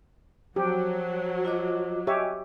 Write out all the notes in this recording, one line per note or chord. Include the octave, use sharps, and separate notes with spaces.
F3 F#3 G4
F4 D#5 D6
F#4 G4 C#5 D#5 E5 G#5